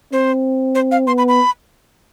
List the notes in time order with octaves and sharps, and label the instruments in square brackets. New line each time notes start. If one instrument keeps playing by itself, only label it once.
[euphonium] C4 [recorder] C5
[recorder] C5
F5
[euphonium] B3 [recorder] C6
[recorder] B5
B5